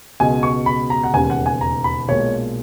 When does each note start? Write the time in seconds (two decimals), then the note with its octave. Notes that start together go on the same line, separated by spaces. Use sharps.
0.20 C#2 B2 G#3 G#5
0.43 C#6
0.66 B5
0.90 A#5
1.04 F#5
1.14 E1 D#2 C#3 G#5
1.30 F#5
1.46 G#5
1.61 A#5
1.84 B5
2.08 B1 A#2 G#3 C#5